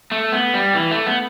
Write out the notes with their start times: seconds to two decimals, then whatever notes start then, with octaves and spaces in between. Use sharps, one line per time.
0.12 A3
0.32 B3
0.54 G3
0.74 E3
0.91 A3
1.06 B3